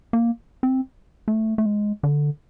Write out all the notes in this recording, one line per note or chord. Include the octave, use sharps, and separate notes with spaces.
A#3
C4
A3
A3
G#3
D3